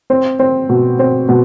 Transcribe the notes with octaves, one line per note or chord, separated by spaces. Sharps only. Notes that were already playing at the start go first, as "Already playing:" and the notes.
C4
C4
B2
C4
B2